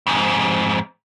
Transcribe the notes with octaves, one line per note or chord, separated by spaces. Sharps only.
F2 G#2